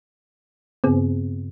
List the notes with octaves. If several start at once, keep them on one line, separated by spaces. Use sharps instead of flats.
G2 C#3 B3 C4 G#4